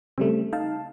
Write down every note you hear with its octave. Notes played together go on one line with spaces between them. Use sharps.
C#3 G3 A3 C4
D#4 F5 A5